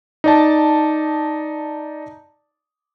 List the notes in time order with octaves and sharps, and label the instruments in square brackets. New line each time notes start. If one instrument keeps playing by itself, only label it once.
[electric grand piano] D#4 D5 A5